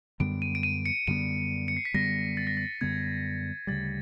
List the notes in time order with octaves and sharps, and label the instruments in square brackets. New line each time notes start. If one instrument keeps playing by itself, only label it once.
[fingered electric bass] F#2 D3 G3 B3 [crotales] D7
[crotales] D#7
D7
D#7
C#7
[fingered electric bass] F#2 D3 G3 B3 [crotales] D#7
[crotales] C#7
C7
B6
[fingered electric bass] F#2 D3 G3 B3 [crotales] A#6
[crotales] A6
A#6
A6
[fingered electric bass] F#2 D3 G3 B3 [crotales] G#6
[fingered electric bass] D2 C#3 E3 G3 [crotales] A6